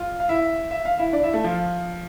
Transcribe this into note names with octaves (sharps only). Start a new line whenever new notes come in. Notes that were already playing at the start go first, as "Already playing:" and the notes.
Already playing: F4
F5
E4 E5
E5
F5
E4 E5
D4 D5
E4 E5
A3 A4
F3 F4